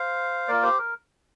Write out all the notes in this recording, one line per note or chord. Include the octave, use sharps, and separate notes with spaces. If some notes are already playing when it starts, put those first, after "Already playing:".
Already playing: C5 F5
A#3 F4 A#4 D5
G4 C5
A#4